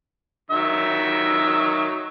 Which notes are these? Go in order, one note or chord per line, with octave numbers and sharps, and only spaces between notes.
D#3 F#3 E5